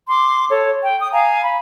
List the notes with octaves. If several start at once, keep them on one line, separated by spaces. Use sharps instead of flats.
C6 D6
A4 C#5
G5
D#6
F5 G#5 A#5
B5